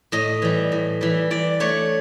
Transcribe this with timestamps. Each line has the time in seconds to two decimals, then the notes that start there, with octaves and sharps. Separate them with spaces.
0.12 A2 D#5
0.42 E3 G3
0.72 A2
1.01 E3 G3
1.31 E3 D5
1.60 A3 D4 C#5